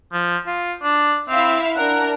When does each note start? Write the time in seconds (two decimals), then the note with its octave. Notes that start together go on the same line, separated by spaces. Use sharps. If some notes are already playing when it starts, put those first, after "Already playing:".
0.13 F3
0.47 F4
0.82 D4
1.30 C4 E4 E5 F5
1.76 D4 A#4 F#5